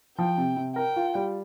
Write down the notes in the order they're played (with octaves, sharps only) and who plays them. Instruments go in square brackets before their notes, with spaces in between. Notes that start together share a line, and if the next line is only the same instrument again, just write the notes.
[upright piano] F3 [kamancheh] G5
[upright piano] C3
C3
[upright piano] A#4 [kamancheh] G5
[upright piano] F4
G3